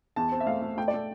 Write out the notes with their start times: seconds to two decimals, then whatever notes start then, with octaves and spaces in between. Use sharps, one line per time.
0.16 E2 A5
0.32 C4
0.40 E5
0.46 A3 F5
0.62 A3
0.77 A3 G5
0.88 D5
0.94 A3